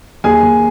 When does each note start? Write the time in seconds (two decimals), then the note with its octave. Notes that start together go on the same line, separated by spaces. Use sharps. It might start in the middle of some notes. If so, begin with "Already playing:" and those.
0.24 D#2 G#4 G#5
0.43 D#2